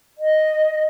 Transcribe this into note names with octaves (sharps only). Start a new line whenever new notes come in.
D#5